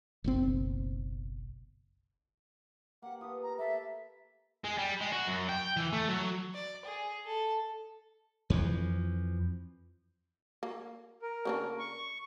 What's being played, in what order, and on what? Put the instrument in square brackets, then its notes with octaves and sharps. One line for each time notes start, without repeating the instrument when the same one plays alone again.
[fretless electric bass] F#1 B1 C4
[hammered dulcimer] A#3 G4 [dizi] F#5
[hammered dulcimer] F4 A4 B4 [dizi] D#6
[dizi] A#5
[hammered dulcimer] A#3 [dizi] A4 [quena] E5
[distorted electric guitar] G#3
G3
G#3
F#4
F#2
G5
E3
A3
F#3
[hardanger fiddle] D5
G#4
A4
[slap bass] F2 E3 F3
[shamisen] A#3
[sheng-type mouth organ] A#4
[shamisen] C#3 A#3 D4
[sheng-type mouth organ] C#6